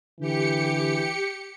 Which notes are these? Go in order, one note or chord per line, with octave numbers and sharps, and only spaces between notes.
D3 E3 G4 C#7